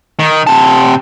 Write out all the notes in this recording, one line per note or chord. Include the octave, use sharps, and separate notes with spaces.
D#3
C3 A5